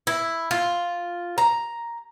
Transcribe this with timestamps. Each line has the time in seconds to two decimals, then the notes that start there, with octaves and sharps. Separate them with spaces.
0.07 E4
0.51 F4
1.38 A#5